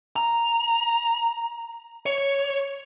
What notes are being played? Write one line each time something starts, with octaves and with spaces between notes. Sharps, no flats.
A#5
C#5